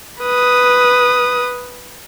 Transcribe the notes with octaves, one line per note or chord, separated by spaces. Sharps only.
B4 D#6